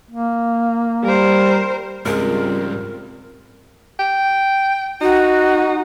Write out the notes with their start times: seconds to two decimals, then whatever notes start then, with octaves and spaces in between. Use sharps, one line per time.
0.11 A#3
1.04 G3 A#4 C5
2.06 C#2 G#2 G3 G#3 C4 C#4 F4 A#4
3.99 G5
5.01 D#4 F#4